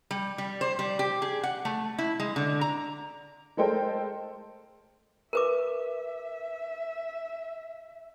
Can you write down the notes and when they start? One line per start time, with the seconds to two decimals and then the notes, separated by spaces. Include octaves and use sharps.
0.11 G3
0.38 G3
0.61 C5
0.79 G3
0.99 G4
1.22 G#4
1.43 F#5
1.65 A3
1.98 E4
2.20 G#3
2.36 D3
2.61 A#5
3.57 G#3 A3 A4 A#4 C5 G5
5.33 A#4 B4 E5 D6